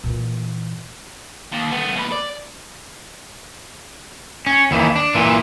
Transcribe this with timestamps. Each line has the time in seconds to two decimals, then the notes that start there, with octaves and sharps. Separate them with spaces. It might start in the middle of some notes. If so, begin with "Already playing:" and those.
0.04 A#2 E3
1.52 D#2
1.71 A3 B3
1.96 D#2 B4
2.12 D5
4.46 C#4
4.71 D#2 E3
4.96 D4
5.15 A#2 E3